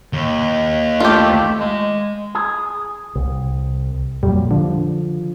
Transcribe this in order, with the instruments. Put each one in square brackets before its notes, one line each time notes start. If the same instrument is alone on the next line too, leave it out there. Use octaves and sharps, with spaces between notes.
[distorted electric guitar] D#2
[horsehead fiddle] A3 [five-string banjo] F4 G4
[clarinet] G#3
[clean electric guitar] G#4
[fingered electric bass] C2
[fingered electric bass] F2 A#2 F#3 [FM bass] G3
[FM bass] D3 [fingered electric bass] F3